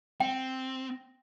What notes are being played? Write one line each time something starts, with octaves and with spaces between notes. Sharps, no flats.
C4 G5